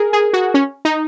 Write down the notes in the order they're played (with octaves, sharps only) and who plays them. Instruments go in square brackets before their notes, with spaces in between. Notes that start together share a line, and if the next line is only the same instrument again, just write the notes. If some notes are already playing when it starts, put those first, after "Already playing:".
Already playing: [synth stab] G#4 A#4
G#4
F#4
C#4
D#4